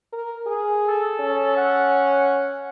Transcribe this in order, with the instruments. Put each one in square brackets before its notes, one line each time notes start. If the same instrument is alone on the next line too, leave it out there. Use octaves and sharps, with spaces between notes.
[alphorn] A#4
G#4
[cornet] A4
[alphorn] C#4
[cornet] F#5